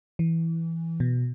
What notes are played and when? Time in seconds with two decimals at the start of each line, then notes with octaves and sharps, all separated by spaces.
0.19 E3
1.00 B2